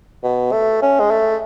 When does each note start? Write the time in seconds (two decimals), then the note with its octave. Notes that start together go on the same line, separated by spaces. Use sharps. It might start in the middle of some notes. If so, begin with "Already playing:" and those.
0.24 B2
0.52 A3
0.82 C#4
1.00 G#3
1.11 A3